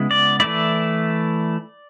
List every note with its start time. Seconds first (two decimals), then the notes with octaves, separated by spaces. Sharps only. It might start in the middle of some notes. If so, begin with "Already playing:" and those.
Already playing: C#3 G#3 B3 E4
0.11 D5
0.40 E3 A3 E4 D5